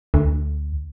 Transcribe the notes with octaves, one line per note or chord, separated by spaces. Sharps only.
D2